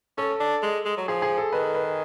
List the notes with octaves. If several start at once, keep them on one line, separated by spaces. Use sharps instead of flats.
C#4 A4
D4
G#3
G#3
F#3
F3 G#4
G#4
A4
D#3 B4
B4